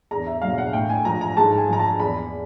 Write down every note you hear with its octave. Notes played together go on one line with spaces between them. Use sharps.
E2 A#5
E5
B2 F#3 F5
F#5
A2 G5
G#5
F3 A#5
A#5
G#2 A5
G#5
F3 A#5
A5
E2 B5